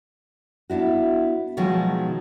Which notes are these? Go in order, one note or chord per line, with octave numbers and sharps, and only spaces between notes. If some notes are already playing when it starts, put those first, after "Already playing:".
B3 D4 E4 F#4
B2 D#3 F3 F#3 G#3